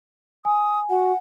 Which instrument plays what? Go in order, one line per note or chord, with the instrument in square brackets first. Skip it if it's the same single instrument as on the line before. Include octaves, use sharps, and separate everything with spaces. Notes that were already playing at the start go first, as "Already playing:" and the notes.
[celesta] G#5 [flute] D#6
[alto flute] F#4 [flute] F#5